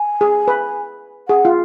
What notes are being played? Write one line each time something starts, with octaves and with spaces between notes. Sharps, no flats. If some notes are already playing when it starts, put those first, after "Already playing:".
Already playing: G#5
G#4
B4
G#4 F#5
F4